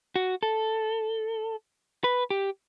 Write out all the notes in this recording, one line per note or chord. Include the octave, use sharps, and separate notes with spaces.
F#4
A4
B4
G4